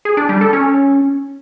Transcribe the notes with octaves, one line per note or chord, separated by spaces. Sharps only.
G#4
D4
G3
A4
C#4